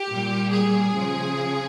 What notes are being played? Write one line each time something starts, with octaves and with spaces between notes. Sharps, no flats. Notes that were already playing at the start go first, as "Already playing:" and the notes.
Already playing: G4
A#2 G3
G#4
C#3 F3